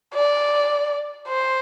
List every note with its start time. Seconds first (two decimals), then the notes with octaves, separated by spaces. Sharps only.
0.15 D5
1.28 C5